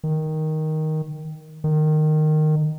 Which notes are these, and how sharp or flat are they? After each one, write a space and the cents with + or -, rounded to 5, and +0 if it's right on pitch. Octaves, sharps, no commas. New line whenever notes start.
D#3 +5
D#3 -15